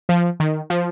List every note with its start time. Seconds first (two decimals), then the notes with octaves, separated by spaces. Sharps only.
0.09 F3
0.40 D#3
0.70 F3